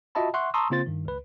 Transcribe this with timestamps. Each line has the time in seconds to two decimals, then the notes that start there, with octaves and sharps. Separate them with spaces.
0.15 F4 F#4 D#5 E5 A5 B5
0.34 E5 F#5 C6 C#6 F#6
0.54 A5 A#5 C6 C#6 D#6 E6
0.70 C#3 A#3 C4 F4 C5 A6
0.86 G2 D#3
1.05 C#2 B4